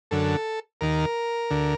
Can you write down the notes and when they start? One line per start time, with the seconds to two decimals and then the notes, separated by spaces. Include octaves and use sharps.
0.11 F#2 D3 A4
0.81 D#2 D#3 A#4
1.51 D2 D3